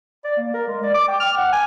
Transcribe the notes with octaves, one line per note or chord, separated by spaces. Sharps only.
D5
A#3
A#4
G#3
D5
D6
G5
F6
F#5
G#5